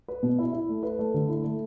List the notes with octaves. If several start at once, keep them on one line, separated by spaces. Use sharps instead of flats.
B4
B2
E4
E4
A3
B4
A3
D3
E4
A3